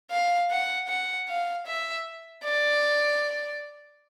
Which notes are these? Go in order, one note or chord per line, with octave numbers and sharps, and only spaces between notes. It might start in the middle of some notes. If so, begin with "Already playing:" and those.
F5
F#5
F#5
F5
E5
D5